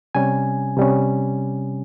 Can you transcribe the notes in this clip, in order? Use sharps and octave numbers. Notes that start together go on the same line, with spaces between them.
C3 G3 C#4 G#5
C3 G3 C#4